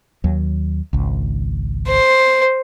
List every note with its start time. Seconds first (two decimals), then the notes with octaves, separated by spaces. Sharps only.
0.24 D#2 F#3
0.93 G#1 C#2
1.88 C5